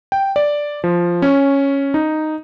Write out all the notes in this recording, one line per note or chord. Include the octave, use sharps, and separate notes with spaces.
G5
D5
F3
C#4
D#4